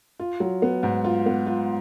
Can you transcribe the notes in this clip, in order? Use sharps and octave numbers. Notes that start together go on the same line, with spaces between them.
F4
F#3
B3
G#2
F4
B3
F4